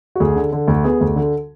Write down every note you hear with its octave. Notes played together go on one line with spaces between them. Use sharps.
F#4
D2 G#4
D3
D3
D2
B3 G#4
D2
D3